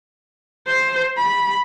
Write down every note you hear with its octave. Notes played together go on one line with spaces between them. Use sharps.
C5
B5